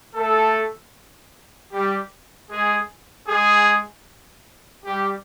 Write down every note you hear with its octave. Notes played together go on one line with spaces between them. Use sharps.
A3 A4
G3 G4
G#3 G#4
G#3 G#4
G3 G4